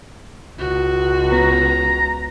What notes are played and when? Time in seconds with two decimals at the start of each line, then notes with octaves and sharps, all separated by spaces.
0.59 C#2 F#4
1.32 B3 A#5